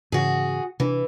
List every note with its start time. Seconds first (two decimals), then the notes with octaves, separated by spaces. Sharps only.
0.12 G#2 C#3 E3 F#4 G#4
0.80 C3 E3 D4